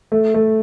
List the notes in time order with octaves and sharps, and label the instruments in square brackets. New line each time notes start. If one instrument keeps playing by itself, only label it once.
[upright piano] A3
A3